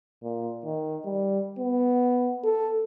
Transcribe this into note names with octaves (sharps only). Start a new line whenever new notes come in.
A#2
D#3
G3
B3
A4